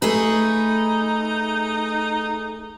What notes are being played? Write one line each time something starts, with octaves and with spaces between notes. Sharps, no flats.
A3 D#4 G#4 B4